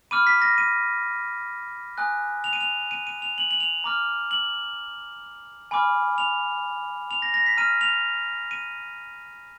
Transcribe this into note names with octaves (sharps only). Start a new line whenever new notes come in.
B5 D6 F6 D#7
B6
A#6
D#7
G#5 D#6 F#6
F7
D#7
F7
D#7
D#7
F7
F#7
F#7
F7
A#5 D6 F6
F#7
G#5 B5 D6 F6
F7
F7
A#6
A#6
B6
A#5 F6 D#7
F7
D#7